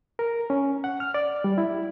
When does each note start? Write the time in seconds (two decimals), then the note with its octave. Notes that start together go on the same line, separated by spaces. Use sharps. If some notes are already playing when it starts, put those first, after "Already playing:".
0.19 A#4
0.50 C#4
0.84 F#5
1.00 F6
1.14 D5
1.44 G3
1.58 E4